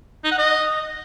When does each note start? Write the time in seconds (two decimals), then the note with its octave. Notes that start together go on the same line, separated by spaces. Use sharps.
0.24 D#4
0.31 F#5
0.38 D#5